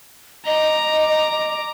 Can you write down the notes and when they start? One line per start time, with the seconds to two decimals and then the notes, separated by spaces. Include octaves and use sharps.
0.46 D#5 A#5 D6